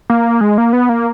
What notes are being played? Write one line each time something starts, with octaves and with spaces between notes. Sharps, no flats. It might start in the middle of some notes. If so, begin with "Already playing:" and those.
A#3
G#3
A#3
B3
A#3